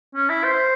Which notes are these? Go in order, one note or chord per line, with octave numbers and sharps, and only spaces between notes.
C#4
E4
C5